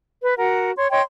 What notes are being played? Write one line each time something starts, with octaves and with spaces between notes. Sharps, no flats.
B4
F#4 A#4 F#5
C#5 C6
C#5 D#5 G5 C6